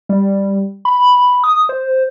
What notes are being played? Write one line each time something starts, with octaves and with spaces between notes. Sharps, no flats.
G3
B5
D#6
C5